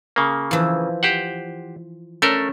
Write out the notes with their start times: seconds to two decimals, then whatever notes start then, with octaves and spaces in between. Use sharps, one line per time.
0.16 C#3 A#3
0.51 E3 F3
1.03 G4 C5 F#5
2.22 A3 C#4 A4 A#4